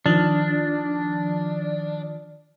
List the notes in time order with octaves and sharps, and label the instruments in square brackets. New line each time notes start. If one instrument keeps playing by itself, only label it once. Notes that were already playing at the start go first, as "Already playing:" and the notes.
[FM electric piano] D#3 F3 [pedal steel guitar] D4